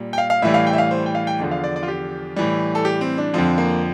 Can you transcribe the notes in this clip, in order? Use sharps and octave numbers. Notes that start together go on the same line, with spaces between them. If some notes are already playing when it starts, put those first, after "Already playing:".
Already playing: A#2 G3
G5
F5
F5
A2 E3 G3 E5
F5
G5
E5
F5
C5
G5
F5
G5
E2 D3 F3
F5
D5
D5
F4
G4
A2 E3 G3
A4
G4
C4
D4
F2 D3 F3 C4
A#3